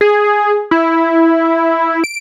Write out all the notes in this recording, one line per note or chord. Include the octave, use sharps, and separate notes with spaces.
G#4
E4
D7